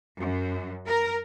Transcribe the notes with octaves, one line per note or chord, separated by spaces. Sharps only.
F#2
A#4